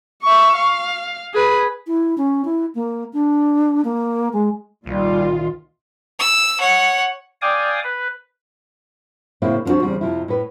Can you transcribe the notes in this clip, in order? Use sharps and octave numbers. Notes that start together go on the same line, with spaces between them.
E5 C#6
F5
G#4 B4
E4
C#4
E4
A#3
D4
A#3
G#3
C2 A#2 D#3 G3 F4
E6
C#5 F#5
D5 F5 G5 G#5 D6 D#6
B4
A2 C#3 A#3 C4 E4
F3 B3 C4 D4 F#4
E2 C#3 G3 C4
F2 C3 F3 E4
A2 B4